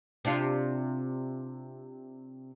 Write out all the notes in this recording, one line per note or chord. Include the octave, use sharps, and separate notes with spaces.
C3 D4 F4